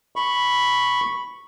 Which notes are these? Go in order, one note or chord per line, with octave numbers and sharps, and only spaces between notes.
B5 C#6